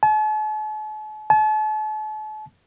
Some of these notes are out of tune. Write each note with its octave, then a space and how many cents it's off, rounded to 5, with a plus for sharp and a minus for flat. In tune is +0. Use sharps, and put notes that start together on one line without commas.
A5 -45
A5 -40